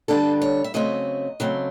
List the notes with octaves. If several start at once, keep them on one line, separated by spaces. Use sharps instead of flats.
D3 G3 B3 D4 A4
C#5
E5
C#3 F#3 A3 C4 D#5
C#3 F#3 A3 C4